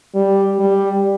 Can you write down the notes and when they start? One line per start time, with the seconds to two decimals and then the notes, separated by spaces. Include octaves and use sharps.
0.15 G3
0.59 G3